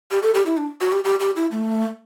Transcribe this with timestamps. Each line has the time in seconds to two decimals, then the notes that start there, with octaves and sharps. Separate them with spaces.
0.11 G4
0.23 A4
0.34 G4
0.46 E4
0.57 D4
0.81 F#4
0.92 G4
1.05 G4
1.20 G4
1.36 E4
1.51 A3